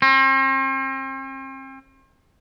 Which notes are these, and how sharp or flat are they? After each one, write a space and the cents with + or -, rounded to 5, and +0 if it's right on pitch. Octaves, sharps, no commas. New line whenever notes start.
C4 +40